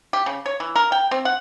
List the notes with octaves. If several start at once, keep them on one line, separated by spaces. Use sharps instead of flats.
G4
C#3
C#5
E3
A#4
G5
C4
F#5